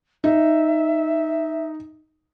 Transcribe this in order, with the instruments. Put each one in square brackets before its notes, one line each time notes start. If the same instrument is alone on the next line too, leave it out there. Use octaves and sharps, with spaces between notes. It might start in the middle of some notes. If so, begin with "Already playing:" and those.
[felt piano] D#4 [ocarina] E5